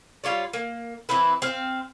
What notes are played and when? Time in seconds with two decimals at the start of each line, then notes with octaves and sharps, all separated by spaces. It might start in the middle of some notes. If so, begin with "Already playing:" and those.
0.24 G3 F4 C#5 D5
0.53 A#3
1.09 E3 C4 E4 B4
1.42 C4 F5